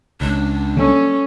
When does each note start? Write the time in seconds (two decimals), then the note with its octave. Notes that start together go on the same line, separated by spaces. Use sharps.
0.21 C#2 D4
0.76 F#3 G3 A#3 C#4 A4